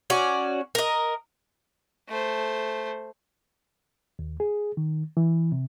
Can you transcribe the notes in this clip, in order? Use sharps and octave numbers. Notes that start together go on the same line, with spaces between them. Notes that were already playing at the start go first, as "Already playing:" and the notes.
C#4 F#4 D5
A#4 D#5
A3 C5
D#2
G#4
D#3
E3
C3